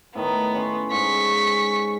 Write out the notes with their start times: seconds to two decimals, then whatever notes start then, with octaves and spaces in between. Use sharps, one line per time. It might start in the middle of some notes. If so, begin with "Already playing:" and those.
0.15 A2 D#3 B3
0.54 C#4 C6
0.92 G#2 C#6 B6